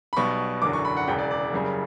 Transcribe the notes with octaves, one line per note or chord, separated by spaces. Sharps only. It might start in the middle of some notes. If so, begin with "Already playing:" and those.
B5
B1 B2 G3 C#6
F#1 E2 D3 F#3 D6
C#6
B5
F#5
E1 E2 C#3 G5
D5
D5
F#1 F#2 C#3 G3